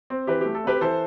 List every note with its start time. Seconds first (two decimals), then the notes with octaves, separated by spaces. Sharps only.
0.10 C4
0.27 E3 G4 B4
0.41 A3 G4
0.55 A4
0.64 C4 G4 B4
0.81 E3 A4 C5